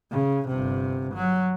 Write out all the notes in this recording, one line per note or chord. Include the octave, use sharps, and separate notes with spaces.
C#3
G1 C3
F#3